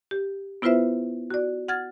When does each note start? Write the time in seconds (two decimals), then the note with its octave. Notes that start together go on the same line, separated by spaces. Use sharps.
0.11 G4
0.62 B3 E4 F4 B4 C5 E5
1.30 F#4 D5
1.68 F#5 F6 G#6 A6